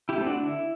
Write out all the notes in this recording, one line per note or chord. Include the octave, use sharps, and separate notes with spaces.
E4 G4
A3 C4
D4 F#4
D3 E4